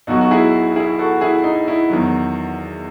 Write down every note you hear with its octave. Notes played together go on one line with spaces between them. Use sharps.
B1 B2 F#3 D#4 F#4
F#4
E4 G#4
E4 G#4
F#4 A4
E4 G#4
D#4
E4
E2 D#3 F#3